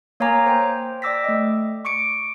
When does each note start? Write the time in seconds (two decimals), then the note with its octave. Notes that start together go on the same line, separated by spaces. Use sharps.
0.20 A#3 C#5 F5 G#5 A#5 D6
0.46 C5 G5
1.02 D5 G5 D6 E6 A#6 B6
1.24 A3 D#5
1.85 C#6 D6 C#7 D7